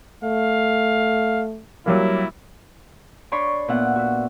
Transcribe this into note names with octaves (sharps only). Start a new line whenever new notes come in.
A3 F5
F#3 G3 A#3 E4
D4 C#5 D5 B5 C6
A#2 B3 F4 E5 F#5
F#4 E5